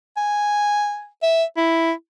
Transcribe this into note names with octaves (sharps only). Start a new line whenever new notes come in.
G#5
E5
E4